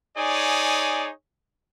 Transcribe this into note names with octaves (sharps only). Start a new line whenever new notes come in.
D#4 G#4 C#5 D5 G#5